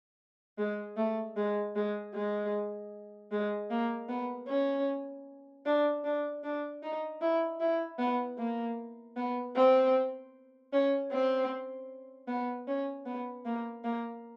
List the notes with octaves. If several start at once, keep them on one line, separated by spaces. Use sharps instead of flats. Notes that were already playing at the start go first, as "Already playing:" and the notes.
G#3
A3
G#3
G#3
G#3
G#3
A#3
B3
C#4
D4
D4
D4
D#4
E4
E4
B3
A#3
B3
C4
C#4
C4
B3
C#4
B3
A#3
A#3